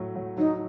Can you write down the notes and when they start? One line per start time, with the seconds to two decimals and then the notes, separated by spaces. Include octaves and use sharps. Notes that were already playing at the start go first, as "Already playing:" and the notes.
Already playing: A2 F#3 A3
0.15 F#3
0.38 F#3 D#4